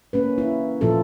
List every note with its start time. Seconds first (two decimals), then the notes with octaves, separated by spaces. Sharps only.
0.13 A#3 C#4 B4
0.38 E4
0.81 A#2 F3 F4 A4